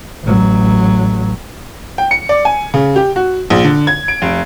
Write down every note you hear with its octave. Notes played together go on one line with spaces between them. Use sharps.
A1 F#3
G5
C#7
D5
G#5
C#3
G4
F#4
A#1
D3
G#6
D7
F1